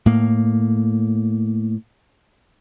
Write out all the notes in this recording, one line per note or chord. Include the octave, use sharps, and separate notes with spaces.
A2 A#3